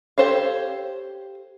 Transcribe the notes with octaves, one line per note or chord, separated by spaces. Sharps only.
G4 A4 C5 C#5 F5